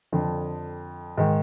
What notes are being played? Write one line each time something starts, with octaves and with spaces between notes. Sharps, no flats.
F2 D3
G#2 D#3